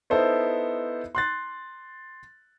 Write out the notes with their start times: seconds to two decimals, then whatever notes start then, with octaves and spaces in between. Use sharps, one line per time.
0.10 B3 D#4 E4 A4 C5
1.15 C6 F#6 A6